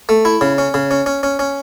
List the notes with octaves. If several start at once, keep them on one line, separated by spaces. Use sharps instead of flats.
A3
E4
C#3
C#4
C#3
C#4
C#4
C#4
C#4